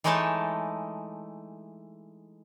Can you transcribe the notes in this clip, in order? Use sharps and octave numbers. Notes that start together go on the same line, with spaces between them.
E3 G#3 A3 D#4 C#5 A5